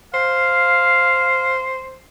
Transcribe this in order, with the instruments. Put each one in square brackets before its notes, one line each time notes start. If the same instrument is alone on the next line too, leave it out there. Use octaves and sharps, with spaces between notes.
[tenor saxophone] C5 [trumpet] F5